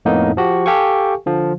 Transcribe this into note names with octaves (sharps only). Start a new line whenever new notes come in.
F2 A2 A#3 B3 D#4
F3 F#4 G4
G4 A4 F5 G5 G#5 C#6
D3 F3